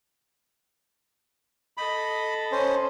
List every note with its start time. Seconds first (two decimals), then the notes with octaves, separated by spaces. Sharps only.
1.77 A4 D#5 B5
2.52 C#4 C5